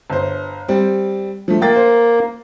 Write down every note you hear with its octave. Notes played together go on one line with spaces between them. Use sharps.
G1 C5
G3 C4
F3 A3
A#3 G5 A6
C5